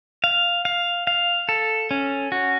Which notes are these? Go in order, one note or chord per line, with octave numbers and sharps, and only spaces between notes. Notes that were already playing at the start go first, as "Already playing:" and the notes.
F5
F5
F5
A4
C#4
F#4